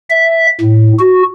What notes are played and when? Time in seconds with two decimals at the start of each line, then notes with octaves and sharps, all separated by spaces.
0.10 E5
0.61 A2
0.99 F#4